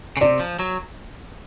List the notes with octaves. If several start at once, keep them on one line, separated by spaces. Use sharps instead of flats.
C#3
C3 D5
F3
F#3